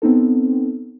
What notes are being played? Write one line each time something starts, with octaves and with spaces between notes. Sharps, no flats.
B3 C4 D#4 A4